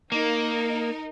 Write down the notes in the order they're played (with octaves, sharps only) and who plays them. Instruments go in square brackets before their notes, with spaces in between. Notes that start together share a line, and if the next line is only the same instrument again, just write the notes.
[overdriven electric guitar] A#3 [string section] D#4 A#4